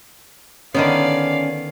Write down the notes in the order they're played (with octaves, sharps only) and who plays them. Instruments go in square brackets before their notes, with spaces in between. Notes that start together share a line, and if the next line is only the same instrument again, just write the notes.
[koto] D3 D#3 B3 [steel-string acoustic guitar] C#4 [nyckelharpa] D5 F5